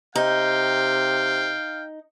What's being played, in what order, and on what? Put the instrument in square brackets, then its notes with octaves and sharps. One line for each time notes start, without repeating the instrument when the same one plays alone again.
[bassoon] C3 [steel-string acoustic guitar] D#4 [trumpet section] F5 G5